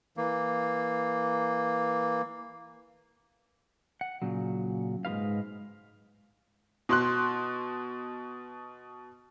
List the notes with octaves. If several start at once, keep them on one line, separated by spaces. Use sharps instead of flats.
E3 A#3
F#5
A#2 C#3 F#3
G#2 G#3 F4 B4 F5
B2 C6 F#6